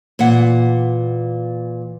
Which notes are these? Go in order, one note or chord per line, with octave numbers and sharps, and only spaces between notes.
A#2 E3 F#5